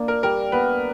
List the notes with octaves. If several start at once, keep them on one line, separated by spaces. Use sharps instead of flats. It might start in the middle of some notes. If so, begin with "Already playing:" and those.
Already playing: A#3 D4
A#4
G3 A#4
B3 B4